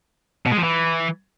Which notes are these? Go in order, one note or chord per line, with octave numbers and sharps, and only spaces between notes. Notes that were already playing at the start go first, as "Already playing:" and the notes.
B2
G#3
F3
E3